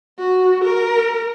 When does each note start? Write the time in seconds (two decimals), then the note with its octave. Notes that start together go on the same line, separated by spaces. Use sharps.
0.18 F#4
0.64 A#4